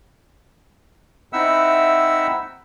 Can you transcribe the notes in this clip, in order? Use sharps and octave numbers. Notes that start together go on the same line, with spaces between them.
C4 D#4 E4 E5 F#5 E6